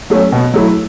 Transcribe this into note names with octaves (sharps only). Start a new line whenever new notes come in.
F#3 A3 C#4
B2
F#3 A3 E4